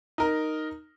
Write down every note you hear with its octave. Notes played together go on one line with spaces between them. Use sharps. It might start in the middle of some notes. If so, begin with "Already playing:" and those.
D#4 A#4